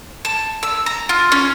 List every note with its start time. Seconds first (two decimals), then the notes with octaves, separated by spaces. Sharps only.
0.25 A5
0.63 E6
0.86 A#5
1.09 F4
1.32 C#4